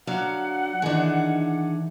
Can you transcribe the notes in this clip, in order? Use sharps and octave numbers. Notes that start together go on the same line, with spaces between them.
D3 F#3 F5 F#5
D#3 E3 D4 G#4